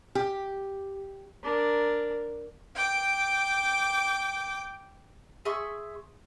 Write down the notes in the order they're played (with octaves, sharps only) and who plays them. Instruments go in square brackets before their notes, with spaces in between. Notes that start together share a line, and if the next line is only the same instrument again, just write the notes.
[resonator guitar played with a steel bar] G4
[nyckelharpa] D4 A#4
[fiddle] G5 D6
[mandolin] G#4 E5 C6 C#6